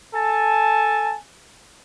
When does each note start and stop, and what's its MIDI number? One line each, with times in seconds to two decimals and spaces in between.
0.14 1.16 69
0.14 1.16 80
0.14 1.16 81